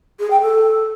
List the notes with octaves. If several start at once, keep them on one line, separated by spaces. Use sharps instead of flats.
G#4
G5
A4